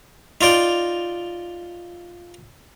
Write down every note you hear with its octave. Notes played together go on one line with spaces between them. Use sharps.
D#4 F4 D5 G5